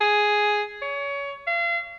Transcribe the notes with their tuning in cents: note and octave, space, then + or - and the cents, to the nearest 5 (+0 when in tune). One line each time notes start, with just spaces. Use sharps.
G#4 +5
C#5 +25
F5 -35